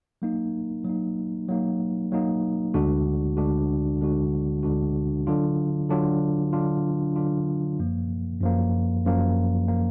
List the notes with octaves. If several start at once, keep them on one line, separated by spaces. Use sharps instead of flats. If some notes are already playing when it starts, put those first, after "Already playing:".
F#3 A#3 D#4
F#3 A#3 D#4
F#3 A#3 D#4
F#3 A#3 D#4
D2 D3 G#3 D4 F#4
D2 D3 G#3 D4 F#4
D2 D3 G#3 D4 F#4
D2 D3 G#3 D4 F#4
D3 F#3 D4 F4
D3 F#3 D4 F4
D3 F#3 D4 F4
D3 F#3 D4 F4
F#2 F3 A#3
F#2 F3 A#3
F#2 F3 A#3
F3 A#3